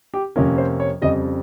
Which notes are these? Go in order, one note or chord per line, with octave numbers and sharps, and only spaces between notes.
G4
F2 C3 F3 A#3 C#4 A#4
C5
C#5
F2 C#3 G3 D#5